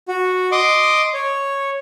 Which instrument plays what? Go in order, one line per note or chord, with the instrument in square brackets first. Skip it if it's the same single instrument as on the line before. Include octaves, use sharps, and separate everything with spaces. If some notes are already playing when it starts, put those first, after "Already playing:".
[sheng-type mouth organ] F#4
D#5 C6 D6
C#5